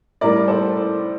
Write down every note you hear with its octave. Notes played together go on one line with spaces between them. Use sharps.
A2 G3 A#4 D5
A4 C5